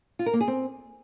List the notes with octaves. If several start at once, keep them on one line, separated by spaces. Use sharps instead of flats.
F4
A#4
A#3
G#4
C4